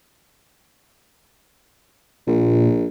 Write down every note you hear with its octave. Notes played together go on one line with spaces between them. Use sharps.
A#1 A#2